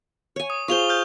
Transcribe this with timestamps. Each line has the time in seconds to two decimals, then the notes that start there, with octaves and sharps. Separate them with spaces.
0.36 C#5 G#5
0.50 D#6
0.68 F4 G#4 C5 C#6 F7 G7
0.89 F6 G6